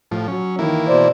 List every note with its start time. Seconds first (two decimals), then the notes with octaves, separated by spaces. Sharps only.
0.11 A2 F3
0.28 F#3 C#4
0.59 D#3 E3 A#3 E4
0.88 B2 C5 D5